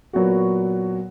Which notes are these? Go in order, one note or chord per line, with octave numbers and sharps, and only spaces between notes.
A#2 F#3 B3 F#4